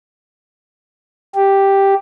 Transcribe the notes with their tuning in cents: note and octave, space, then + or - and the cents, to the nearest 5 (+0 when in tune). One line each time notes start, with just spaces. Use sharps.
G4 +0